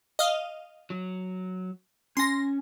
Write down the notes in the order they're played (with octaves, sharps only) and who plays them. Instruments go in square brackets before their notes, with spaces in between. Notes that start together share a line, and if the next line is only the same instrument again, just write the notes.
[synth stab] D#5 F5
[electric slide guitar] F#3
[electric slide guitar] C#4 G#5 [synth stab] C6 A#6